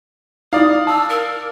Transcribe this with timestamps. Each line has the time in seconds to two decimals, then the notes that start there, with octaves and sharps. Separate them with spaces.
0.53 D#4 E4 D5 F5 D#6
0.87 A5 E6
1.09 A#4